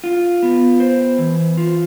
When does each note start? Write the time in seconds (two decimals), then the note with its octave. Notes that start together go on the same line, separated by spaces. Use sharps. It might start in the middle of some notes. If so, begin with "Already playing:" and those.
0.04 F4
0.43 B3
0.80 C5
1.18 E3
1.57 F4